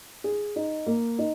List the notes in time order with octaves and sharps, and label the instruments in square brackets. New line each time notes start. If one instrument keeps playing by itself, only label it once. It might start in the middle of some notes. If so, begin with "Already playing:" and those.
[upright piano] G#4
D#4
A#3
D#4